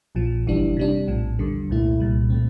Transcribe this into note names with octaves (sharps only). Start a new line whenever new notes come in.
A#1 A#2 F3
G1 F2 E3 G3 D4
C3 G3 D4
A#1 A2 F3
E2 D3 G3
C2 A#2 A3 E4
C2 A#2 G3
A#2 A3 C4